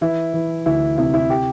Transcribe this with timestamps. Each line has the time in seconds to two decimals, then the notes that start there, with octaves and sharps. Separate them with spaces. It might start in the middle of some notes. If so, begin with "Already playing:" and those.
0.01 E3 E4
0.34 E3
0.66 D2 E4
0.98 C3 E4
1.14 E4
1.30 G4